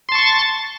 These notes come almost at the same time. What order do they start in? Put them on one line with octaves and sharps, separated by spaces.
C6 A5 C#6 A6